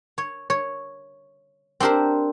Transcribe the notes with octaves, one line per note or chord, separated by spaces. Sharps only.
C#5
C#5
C4 D4 G4 A#4 C5